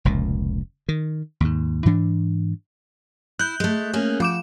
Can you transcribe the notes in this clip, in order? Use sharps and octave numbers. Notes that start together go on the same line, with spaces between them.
F1 C#2 A#2
D#3
D#2 G#2
G#2 E3 D4
E4 F#6 G6
G#3 A3
A#3 C#4 G#4
F3 F#4 D6 E7